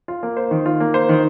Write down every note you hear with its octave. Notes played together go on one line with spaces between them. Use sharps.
F4
A#3
C5
D#3
F4
A#3
C5
D#3